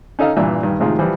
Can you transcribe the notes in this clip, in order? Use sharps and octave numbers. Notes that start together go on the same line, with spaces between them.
C#4 D#4 A4 D#5 F5
G2 A#2 E3 D4 E5
G2 D#3
F2 A2 C3 D#3 G#3 F4
E3 F3 G3